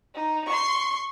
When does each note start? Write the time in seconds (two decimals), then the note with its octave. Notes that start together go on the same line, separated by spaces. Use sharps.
0.15 D#4
0.47 C6 C#6